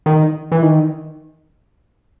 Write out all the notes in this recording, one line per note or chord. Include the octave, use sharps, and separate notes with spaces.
D#3
E3
D#3